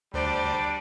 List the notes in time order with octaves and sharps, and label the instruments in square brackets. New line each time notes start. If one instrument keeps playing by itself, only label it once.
[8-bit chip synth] D2 C5 [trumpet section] G3 D4 [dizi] D5